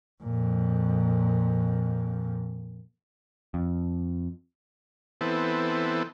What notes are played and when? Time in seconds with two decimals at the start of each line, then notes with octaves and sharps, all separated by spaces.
0.22 F2 A#2
3.54 F2
5.21 E3 B3 C4 A4